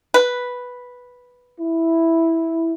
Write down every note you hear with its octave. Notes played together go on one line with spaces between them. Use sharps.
B4
E4